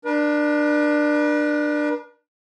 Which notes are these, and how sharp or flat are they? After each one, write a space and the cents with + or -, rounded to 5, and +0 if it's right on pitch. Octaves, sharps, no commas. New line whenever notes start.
D4 +20 B4 -45